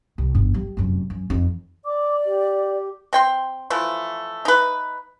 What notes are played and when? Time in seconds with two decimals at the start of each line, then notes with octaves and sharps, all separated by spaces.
0.18 C2
0.35 G1 E2
0.54 G3
0.77 F1 F#2
1.10 F#2
1.30 F2 D#3
1.85 D5 D6
2.25 G4
3.13 C4 G5 C6
3.70 E3 F3 A3
4.45 D#4 B4